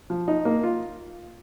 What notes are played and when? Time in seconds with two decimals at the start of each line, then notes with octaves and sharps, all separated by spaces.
0.10 F3
0.28 D#4
0.45 A#3
0.63 F4